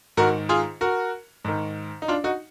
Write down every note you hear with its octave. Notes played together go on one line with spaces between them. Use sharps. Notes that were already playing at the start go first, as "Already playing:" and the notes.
G#2 D#3 F#4 A#4
F4 G#4
F#4 A#4
G#2 D#3
D#4
D4 F4
D#4 F#4